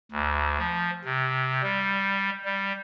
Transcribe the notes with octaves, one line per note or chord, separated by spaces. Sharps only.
D2
F3
C3
G3
G3